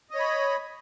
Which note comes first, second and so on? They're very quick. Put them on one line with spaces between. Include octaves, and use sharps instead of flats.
D#5 C#5 B5